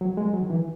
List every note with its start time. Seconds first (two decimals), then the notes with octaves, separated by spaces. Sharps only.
0.01 F#3
0.17 G#3
0.33 F#3
0.42 D#3
0.50 E3